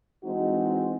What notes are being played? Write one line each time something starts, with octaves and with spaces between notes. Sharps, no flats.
E3 G#3 C4 D#4 F#4